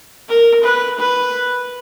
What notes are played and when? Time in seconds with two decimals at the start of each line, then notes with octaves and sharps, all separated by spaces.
0.28 A#4
0.63 B4
0.99 B4